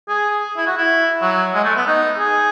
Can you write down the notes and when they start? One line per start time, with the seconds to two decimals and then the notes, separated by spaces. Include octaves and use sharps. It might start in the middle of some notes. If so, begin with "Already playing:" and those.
0.09 G#4
0.57 E4
0.67 F#4
0.78 E4
1.22 F#3
1.55 G#3
1.64 A3
1.76 B3
1.87 D#4
2.19 G#4